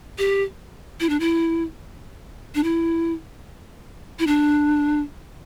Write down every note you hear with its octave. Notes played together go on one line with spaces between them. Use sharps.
G4
E4
D4
E4
D4
E4
E4
D4